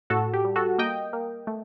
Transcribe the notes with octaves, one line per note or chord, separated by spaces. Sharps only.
A2 F#4 A4
G4
G3
F#4 A4
A#3 D#5 G5
A#3
A3